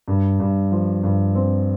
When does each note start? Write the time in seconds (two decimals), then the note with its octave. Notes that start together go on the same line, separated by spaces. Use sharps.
0.08 G2
0.40 G2
0.72 F3
1.03 G2
1.35 C4